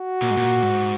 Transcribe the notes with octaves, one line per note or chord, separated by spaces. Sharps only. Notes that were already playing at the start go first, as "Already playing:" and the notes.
Already playing: F#4
A#2
G#2
A#2
G#2